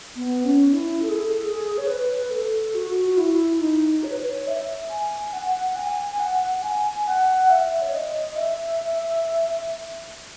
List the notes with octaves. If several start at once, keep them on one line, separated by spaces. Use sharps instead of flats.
B3
C#4
E4
A4
G#4
A4
G#4
C#5
B4
A4
F#4
F#4
E4
D#4
C#5
B4
C#5
E5
G#5
F#5
G#5
F#5
G#5
F#5
E5
C#5
D#5
E5